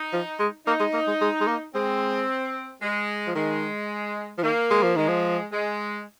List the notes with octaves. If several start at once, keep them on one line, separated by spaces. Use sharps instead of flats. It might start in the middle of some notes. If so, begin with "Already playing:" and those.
Already playing: D#4
F3
G#3
A#3 D#4
G#3
A#3
G#3
G#3
G#3
A#3
G#3 C4
G#3
F3
D#3 G#3
F3
D#3 A#3
G#3
F3
D#3 G#3
F3
G#3